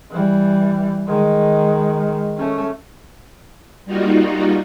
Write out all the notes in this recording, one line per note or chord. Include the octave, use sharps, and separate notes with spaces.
E3 G3
D#3 G#3
A3 C#4
G3 A#3 D#4 F4 F#4